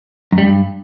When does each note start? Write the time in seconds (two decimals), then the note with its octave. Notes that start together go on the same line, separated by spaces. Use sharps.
0.32 F#2
0.38 G3
0.43 G2